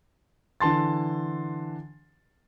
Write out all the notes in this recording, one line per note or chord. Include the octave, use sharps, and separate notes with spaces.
D3 E3 A5 C6 A6